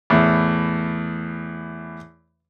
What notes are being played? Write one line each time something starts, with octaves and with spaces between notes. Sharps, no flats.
E2 A2